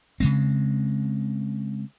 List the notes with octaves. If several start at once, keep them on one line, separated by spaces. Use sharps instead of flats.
C#3 G#3 C4